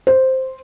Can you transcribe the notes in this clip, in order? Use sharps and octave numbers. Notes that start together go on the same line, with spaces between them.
C5